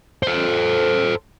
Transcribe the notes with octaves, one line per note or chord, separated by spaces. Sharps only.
A4 C5